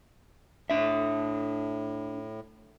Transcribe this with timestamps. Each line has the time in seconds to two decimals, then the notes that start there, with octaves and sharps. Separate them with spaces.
0.70 A2 D4 E5